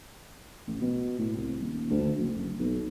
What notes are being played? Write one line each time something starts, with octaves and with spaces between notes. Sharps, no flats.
A1
B2
A2
C2
D#1
D2
F#1
F#1
B1